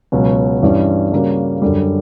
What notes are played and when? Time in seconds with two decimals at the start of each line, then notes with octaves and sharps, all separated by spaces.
0.12 C#2 B2 F#3 C#4
0.62 G2 E3 G3 C#4
1.12 C#3 G3 A#3 C#4 F#4
1.62 F#2 D3 G3